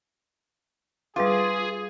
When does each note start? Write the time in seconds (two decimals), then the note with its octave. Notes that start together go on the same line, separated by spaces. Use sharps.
1.16 G3 F4 G#4 B4 D6